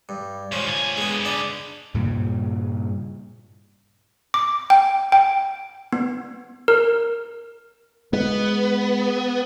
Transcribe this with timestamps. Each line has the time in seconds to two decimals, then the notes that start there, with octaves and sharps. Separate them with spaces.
0.09 G2
0.52 F3 G#3 C4 C#4
0.66 D3 G#5
0.97 G#3 B3
1.25 D4 D#5
1.94 G2 A#2 C#3 G3
4.34 D6
4.70 G5
5.12 G5
5.93 B3
6.68 A#4
8.13 G#3 B3